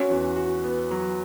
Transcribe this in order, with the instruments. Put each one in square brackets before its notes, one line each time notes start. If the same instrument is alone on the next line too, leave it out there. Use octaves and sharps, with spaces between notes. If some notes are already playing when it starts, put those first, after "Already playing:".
Already playing: [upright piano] C#4 [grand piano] F#4
[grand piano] E2
F#4
B3
F#3